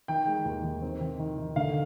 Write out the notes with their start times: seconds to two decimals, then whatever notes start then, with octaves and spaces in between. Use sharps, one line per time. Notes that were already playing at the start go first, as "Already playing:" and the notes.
0.08 D#3 G5
0.27 G#3
0.45 D#2
0.64 D#3
0.82 C4
1.01 D#3
1.19 D#3
1.38 D#3
1.56 D3 F5